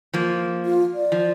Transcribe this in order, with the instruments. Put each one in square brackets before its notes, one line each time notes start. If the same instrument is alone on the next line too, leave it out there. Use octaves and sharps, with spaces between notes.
[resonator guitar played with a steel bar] F3 A#3
[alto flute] F4
D5
[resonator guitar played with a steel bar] F3